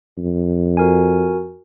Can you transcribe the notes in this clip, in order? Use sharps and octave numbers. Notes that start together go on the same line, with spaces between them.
F2
F#4 A#4 G#5